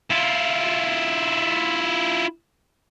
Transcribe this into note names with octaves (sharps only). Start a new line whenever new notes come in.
E4 F4